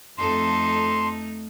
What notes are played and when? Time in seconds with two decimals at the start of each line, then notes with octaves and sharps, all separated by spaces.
0.18 F2 A3 D#4 A4 C6